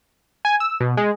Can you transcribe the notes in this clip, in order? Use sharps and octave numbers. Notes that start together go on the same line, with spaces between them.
G#5
E6
B2
G#3